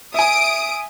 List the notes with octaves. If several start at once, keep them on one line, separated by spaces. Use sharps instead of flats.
E5 G#5 D#6 D7